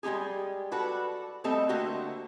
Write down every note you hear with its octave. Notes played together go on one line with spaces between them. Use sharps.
G3 G#3 D#4 G4 G#4
F#4 A4 B4 D5
G3 A3 C4 A4 D#5
D3 A3 A#3 F#4 G4 C5